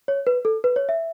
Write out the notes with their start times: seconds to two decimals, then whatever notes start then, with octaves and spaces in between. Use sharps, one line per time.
0.08 C#5
0.27 B4
0.45 A4
0.64 B4
0.76 C#5
0.89 E5